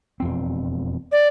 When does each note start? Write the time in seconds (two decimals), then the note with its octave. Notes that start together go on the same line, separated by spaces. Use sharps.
0.20 E1 F2 C4
1.11 D5